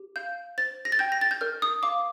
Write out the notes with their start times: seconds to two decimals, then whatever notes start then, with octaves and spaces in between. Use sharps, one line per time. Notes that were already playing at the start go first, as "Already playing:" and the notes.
Already playing: G4
0.16 F5 G6
0.58 C5 A6
0.85 A#6
0.92 A6
0.99 G5 G6
1.12 A#6
1.21 A6
1.31 G6
1.41 A#4 F6
1.62 D#6
1.83 F5 D6